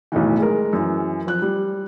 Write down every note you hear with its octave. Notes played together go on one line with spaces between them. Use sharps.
B1 A2 D#3 E3
G#3 A#4
F#2 E3
F3 F#6
G3